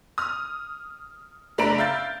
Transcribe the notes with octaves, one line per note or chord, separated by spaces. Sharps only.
D#6 F6
F#1 A3 D4 A#5 B5 D7
E5 F5 G6 A6